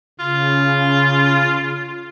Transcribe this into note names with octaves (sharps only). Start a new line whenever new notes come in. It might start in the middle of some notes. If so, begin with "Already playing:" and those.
C#3 F4